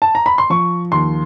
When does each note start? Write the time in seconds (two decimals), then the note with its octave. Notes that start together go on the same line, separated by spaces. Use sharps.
0.02 A5
0.15 A#5
0.26 B5
0.38 C6
0.50 F3 C#6
0.92 D#2 C6